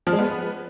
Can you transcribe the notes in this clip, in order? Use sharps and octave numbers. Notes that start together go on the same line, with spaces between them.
F3
G#3
B3